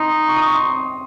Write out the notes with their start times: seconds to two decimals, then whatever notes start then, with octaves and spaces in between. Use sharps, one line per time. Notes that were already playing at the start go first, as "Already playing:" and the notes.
Already playing: D#4 C6
0.28 C#6
0.37 D#6
0.46 C#6
0.55 C6